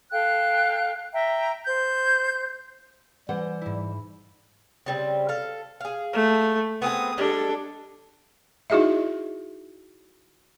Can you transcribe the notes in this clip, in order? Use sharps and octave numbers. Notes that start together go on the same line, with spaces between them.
A4 F5 G5 F#6
E5 G5 A#5
C5 G6
E3 G3 C5 F#5
G#2 E4
C#3 G3 C4
A4 F5
G#4 F5
A3
B3 C4 G#4 D#6
G3 G#3 D4 A4
D#4 E4 F#4 G#4 D#5 E5